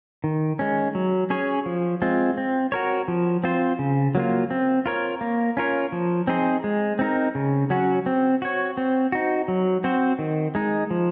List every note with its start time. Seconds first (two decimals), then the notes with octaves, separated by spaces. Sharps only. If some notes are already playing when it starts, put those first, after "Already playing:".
0.24 D#3
0.59 G#3 C#4
0.95 F#3
1.30 C#4 G#4 C#5
1.66 F3
2.02 G#3 C4 F4
2.37 C4
2.72 F#4 A#4 C#5
3.08 F3
3.44 C4 F4 C5
3.79 C#3
4.15 F#3 A#3 F4
4.50 C4
4.86 F4 A#4 C#5
5.21 A#3
5.57 C#4 F4 A#4 C#5
5.92 F3
6.27 C4 D#4 G#4 C5
6.64 G#3
6.99 C4 D#4 A#4
7.35 C#3
7.70 F#3 C#4 F#4
8.06 C4
8.42 F#4 C#5
8.77 C4
9.12 D#4 F#4
9.48 F#3
9.84 C4 F#4 C5
10.19 D#3
10.55 G#3 D#4
10.91 F3